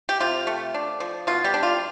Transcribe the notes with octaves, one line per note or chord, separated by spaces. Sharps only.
G4
C3 F4
A3
D4
F3
B2 F4
G3 G4
D4
F4